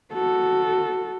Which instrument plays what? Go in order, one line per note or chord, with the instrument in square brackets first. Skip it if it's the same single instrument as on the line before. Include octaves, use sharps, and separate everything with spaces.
[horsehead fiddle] F#4 A4